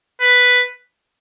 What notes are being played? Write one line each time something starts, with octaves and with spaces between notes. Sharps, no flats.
B4